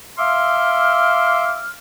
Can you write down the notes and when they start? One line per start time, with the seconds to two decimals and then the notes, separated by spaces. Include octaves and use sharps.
0.18 E5 F5 C6 D6 E6 F6